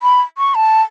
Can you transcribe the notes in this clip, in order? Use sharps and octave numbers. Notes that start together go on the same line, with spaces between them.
B5
C#6
A5